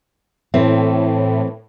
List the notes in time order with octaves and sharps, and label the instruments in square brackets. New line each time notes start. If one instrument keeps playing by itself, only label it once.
[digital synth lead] A2 [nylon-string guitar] E3 C4